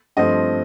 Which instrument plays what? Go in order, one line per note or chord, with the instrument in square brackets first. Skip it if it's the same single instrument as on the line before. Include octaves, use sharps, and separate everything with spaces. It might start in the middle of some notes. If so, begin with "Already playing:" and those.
[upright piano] G2 F3 A3 C4 D#5